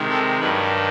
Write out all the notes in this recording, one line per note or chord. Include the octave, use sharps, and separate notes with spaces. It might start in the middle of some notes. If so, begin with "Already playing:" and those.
Already playing: C3 D#3 G#3
A4
G2 D#3 F#3 B4